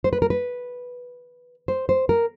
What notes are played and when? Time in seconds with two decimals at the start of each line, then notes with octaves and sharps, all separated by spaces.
0.04 C5
0.13 B4
0.22 A#4
0.30 B4
1.68 C5
1.89 C5
2.09 A#4